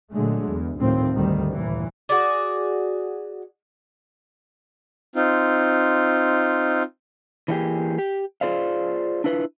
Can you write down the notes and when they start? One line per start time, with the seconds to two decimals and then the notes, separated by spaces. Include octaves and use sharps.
0.12 A#2 D3 F#3 G#3 A3
0.48 E2
0.78 D2 A2 C3 D#3 F3 C4
1.14 D2 G2 D#3 G3
1.51 D#2 A#2 E3
2.09 F#4 G#4 D5
5.16 C4 D#4 F4
7.48 E3 A3 A#3 C#4 G4 G#4
7.99 G4
8.41 F4 G#4 C5 D5 F5
9.24 D4 E4 F4 B4